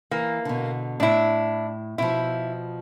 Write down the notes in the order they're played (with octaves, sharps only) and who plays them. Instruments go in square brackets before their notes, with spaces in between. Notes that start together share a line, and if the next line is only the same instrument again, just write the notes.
[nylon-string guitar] E3 [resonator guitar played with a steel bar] A#3
[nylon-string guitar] B2 D3
[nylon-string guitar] A2 [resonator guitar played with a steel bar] D4 E4
[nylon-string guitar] B2 F3 [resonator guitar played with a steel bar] E4